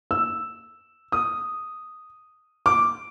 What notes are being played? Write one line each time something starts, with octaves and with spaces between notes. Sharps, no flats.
E6
D#6
D6